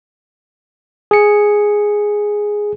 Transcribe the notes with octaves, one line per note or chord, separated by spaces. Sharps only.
G#4 C#7